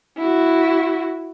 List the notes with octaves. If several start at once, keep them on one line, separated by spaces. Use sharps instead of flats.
E4 F#4